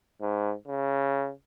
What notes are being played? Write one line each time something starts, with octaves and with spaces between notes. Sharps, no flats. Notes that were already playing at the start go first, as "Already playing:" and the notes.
G#2
C#3